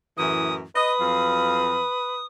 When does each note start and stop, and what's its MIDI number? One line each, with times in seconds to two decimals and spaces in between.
0.17 0.62 42
0.17 0.62 45
0.17 0.62 52
0.17 0.54 87
0.76 2.23 71
0.76 0.91 75
0.76 2.26 87
0.99 1.84 41
0.99 1.84 54
0.99 1.84 77